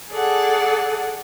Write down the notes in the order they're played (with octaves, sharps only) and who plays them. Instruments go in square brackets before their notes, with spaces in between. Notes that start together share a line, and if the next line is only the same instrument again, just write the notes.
[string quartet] G#4 A4 D5 F#5